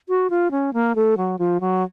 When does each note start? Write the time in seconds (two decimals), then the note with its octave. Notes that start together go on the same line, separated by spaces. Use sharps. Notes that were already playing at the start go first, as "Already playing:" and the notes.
0.09 F#4
0.30 F4
0.51 C#4
0.73 A#3
0.96 A3
1.17 F#3
1.39 F3
1.60 F#3